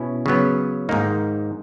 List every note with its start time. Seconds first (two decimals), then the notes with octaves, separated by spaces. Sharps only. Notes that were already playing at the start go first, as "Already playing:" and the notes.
Already playing: B2 C#4 E4
0.26 C#3 F#3 B3
0.89 G#2 D#3 A#3 D#4